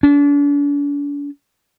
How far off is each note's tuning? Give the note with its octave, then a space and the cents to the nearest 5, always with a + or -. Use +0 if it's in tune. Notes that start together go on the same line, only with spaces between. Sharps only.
D4 -40